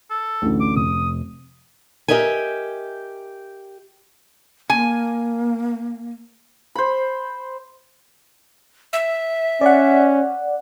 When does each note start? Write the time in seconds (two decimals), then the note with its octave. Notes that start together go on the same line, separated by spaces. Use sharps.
0.10 A4
0.42 A1 D2 D3
0.61 D6
0.76 F1 D#6
2.08 G4 G#4 A#4 D#5 E5 G#5
4.70 A#3 G#5
6.75 C5 B5
8.93 E5
9.61 C#4 D5 F#5